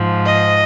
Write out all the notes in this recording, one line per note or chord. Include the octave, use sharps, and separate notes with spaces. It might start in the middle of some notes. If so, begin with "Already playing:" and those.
Already playing: G#2 F3
D#5